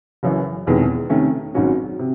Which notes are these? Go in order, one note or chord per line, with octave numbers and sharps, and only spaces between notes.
F#1 F#2 E3
E1 E2 C3 D#3 G#3
C3 D#3 A3 C#4
G#1 G#2 F#3 C#4 F#4
C3